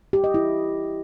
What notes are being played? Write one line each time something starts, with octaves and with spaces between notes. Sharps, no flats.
G4
D#5
E4